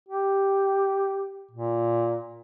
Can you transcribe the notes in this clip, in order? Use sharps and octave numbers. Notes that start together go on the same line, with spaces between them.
G4
A#2